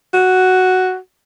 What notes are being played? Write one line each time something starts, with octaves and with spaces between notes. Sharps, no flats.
F#4